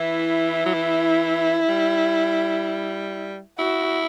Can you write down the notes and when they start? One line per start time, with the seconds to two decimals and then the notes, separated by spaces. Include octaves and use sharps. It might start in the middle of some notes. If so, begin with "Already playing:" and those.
Already playing: E3 E4
0.66 F#3
0.74 E3
1.69 G3
3.59 E4 F#4